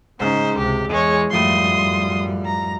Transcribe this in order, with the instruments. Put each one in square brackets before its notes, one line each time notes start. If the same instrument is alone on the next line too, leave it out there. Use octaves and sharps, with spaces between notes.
[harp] G#2 [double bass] C#3 D#4 [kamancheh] C#4 C5
[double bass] C#2 C3 [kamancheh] G4
[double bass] E2 E3 [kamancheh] G#3 C#5
[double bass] F#2 G3 [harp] A2 F3 D#4 [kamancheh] C6 D#6
[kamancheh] A#5